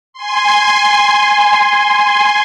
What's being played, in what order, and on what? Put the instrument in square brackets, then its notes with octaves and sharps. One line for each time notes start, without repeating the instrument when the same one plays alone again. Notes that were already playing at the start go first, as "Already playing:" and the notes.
[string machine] G#5 C6